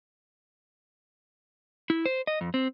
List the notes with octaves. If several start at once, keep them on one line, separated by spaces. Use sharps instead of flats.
E4
C5
D#5
F2
C4